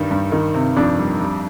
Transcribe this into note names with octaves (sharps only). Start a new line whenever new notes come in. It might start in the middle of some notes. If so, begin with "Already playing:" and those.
Already playing: G2 D#3 G3
G2
D#3
C3
F2 D4
G3
G3